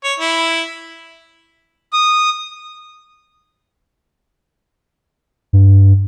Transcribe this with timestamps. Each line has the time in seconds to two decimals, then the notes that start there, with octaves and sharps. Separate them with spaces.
0.04 C#5
0.19 E4
1.93 D#6
5.53 G2